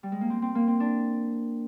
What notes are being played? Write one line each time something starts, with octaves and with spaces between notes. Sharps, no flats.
G3
G#3
A#3
C4
C4
A#3
C4
D4